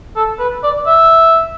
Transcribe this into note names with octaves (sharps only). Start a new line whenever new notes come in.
A4
B4
D5
E5